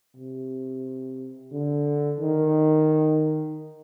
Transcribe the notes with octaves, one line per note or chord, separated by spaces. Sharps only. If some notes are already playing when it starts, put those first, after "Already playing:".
C3
D3
D#3